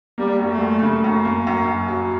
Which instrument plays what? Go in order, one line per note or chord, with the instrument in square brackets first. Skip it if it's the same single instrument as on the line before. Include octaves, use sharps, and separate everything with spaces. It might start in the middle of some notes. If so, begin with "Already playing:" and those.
[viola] G3 [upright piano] A#3
[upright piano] F#2
[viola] A3
[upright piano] F#2
C#3
F#2
A#3
F#2
F#2
F#3